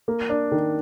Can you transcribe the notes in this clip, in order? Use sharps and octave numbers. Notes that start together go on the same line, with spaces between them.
A#3
D4
D#3